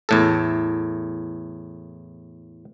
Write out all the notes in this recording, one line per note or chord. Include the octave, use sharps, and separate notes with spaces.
E2 A2 A4